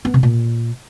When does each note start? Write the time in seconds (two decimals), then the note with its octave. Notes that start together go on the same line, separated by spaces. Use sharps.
0.05 B3
0.14 C3
0.23 A#2